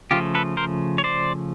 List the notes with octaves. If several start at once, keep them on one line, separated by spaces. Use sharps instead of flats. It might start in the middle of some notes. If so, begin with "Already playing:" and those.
C#3 F3 A3 F4 G4
A4 B4
A#4 C5
C#5
C5 D5